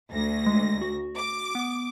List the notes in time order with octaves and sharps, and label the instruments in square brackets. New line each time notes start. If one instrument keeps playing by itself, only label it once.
[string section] D2 A#6
[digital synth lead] G#3
F#4
[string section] D6
[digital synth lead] B3